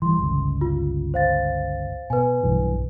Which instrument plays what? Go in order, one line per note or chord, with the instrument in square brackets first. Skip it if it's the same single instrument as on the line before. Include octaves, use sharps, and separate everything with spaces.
[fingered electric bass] E3 G3 [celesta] C6
[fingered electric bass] G1 C#2
[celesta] F4
C5 F5 A6
[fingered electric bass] B2 [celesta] B4 G#5
[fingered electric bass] B1 G2 E3